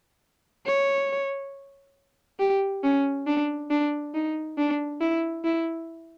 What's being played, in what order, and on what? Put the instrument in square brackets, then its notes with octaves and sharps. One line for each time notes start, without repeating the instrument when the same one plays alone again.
[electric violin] C#5
G4
C#4
D4
D4
D#4
D4
E4
E4